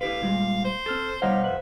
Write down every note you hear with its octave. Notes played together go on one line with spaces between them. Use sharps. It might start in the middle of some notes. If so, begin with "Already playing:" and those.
E4 G4 B4 F5
A#2 G3 G#3
C5
C4 A4 F6 A6
B2 G3 D#4 C5 C#5 F5 F#5
F2 B4 E5